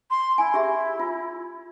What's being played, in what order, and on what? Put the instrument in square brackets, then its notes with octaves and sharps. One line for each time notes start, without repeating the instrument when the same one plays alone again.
[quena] C6
[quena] E4 [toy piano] G#5
[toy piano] G4 G#4 E5
F4